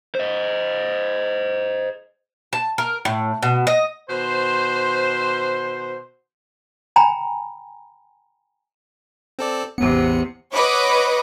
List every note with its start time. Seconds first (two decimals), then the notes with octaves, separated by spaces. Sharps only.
0.15 C5 D#5
2.53 A5
2.78 A#4
3.05 A2
3.42 B2
3.67 D#5
4.09 B2 D#3 C5
6.96 G5 G#5 A#5 B5
9.39 C4 A4 D5
9.78 A1 E2 C3 B3 C#7
10.54 B4 C#5 D#5 F#5 B5 D6